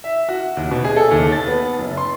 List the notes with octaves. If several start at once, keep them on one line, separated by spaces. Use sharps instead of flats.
E5
F#4
D#2
B2
G#4
A4
D#2
A6
B3
F#1
C6